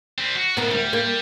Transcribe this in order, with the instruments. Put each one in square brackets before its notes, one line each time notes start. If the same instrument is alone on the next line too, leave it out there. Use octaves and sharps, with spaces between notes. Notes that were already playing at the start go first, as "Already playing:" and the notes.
[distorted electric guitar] G3 C4
F#4
[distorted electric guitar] A2 C#3 [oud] B3 A#4
[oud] D2 [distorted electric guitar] G3
[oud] A#3